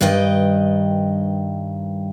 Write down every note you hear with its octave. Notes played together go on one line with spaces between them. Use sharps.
G2 D#3 B4 D#5 G5